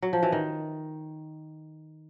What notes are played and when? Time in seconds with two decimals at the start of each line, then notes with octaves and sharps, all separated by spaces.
0.02 F#3
0.13 F3
0.23 E3
0.32 D#3